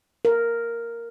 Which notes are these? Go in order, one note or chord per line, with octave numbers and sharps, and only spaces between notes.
A#4